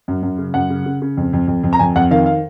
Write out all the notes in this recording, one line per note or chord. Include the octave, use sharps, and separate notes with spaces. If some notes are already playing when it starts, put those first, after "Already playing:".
F#2
F#2
C#3
F#2 F#5
C#3
C#3
C#3
F2
F2
F2
F2
A#5
F2 G#5
F2 F#5
D#3 F5
F5